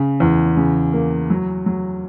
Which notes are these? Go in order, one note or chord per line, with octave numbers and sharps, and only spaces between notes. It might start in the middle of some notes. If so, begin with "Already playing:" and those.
Already playing: C#3
E2
C#3
A#3
F#3
F#3